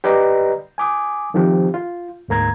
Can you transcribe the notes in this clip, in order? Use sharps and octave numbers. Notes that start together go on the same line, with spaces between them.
G4 B4 D5 D#5 A#5 B5
G#5 D6 D#6
D#3 F3 C4 F4 G4
F4
D2 G#2 A#3 A#5 G#6